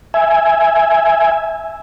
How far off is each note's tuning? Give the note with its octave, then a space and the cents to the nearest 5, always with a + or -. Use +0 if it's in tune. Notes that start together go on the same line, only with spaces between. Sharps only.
E5 +0 G#5 +0